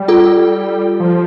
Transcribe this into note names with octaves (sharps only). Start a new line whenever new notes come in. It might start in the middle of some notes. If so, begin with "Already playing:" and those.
Already playing: G3
F4 A4
F3